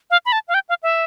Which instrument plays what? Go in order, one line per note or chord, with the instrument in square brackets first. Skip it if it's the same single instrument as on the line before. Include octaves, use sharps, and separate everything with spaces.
[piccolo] F5
B5
A5
F5
G5
F5
E5